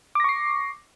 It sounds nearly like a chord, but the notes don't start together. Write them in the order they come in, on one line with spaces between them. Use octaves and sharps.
D6 A#6 C#6 C7